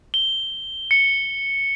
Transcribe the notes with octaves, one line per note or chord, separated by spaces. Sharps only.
G7
C#7